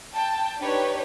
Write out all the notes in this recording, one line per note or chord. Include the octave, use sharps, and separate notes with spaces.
G5 A5
D4 D#4 G4 B4 C#5